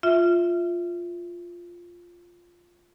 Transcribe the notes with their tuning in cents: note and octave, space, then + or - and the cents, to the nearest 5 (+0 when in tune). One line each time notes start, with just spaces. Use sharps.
F4 +0 E5 +0